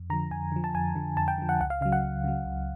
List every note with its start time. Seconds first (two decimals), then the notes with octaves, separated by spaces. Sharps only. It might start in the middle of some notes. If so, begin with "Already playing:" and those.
Already playing: F2
0.10 D3 A#5
0.13 F3
0.31 F2 G#5
0.52 D3 F3
0.64 A5
0.74 F2 G#5
0.95 D3 F3
1.17 F2 A5
1.28 G5
1.38 D3 F3
1.49 F#5
1.60 C#2 F#5
1.70 F5
1.81 C#3 F5
1.85 F#3
1.92 F#5
2.03 C#2
2.24 C#3 F#3
2.46 C#2